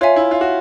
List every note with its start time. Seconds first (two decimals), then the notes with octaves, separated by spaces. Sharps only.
0.01 F4 C#5 E5 G#5
0.16 E4
0.31 F4
0.41 F#4